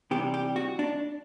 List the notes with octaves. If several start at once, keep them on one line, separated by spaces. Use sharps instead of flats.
C3 E3 G3 G4
G4
F#4
D4